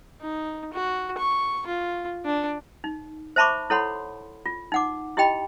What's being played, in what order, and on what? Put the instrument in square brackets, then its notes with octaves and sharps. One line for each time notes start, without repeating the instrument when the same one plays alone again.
[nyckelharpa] D#4
F#4
C#6
F4
D4
[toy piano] D#4
C5 E5 A5 B5 C#6 D6
E4 A4 C#5 F#5 B5 C6
F4
D#4 F#5 D6
E4 G4 D#5 G5 B5